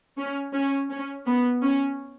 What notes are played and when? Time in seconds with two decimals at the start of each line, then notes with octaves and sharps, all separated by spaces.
0.18 C#4
0.54 C#4
0.91 C#4
1.27 B3
1.63 C#4